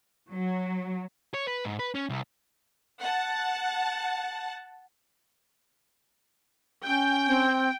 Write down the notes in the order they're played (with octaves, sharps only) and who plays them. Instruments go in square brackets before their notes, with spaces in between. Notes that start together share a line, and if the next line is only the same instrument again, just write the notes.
[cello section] F#3
[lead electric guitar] C#5
B4
G#2
B4
C#4
C2
[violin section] F#5 A5
[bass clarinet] C#4 [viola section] G5
[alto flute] C4